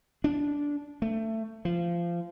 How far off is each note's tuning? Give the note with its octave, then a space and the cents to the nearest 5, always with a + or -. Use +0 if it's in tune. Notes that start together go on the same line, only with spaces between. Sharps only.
D4 -15
A3 +20
F3 -20